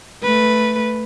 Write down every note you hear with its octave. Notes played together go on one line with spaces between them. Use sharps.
A3 B4